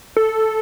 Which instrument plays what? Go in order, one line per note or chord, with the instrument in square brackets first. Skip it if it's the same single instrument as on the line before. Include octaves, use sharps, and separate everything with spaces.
[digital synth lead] A4